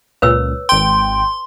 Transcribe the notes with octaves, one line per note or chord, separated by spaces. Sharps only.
C#2 A#2 B4 C#5 E6
G#1 G5 C6